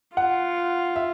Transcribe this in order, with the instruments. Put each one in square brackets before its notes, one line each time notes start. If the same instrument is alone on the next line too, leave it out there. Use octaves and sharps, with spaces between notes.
[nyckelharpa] F4 [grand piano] F#5
[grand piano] E5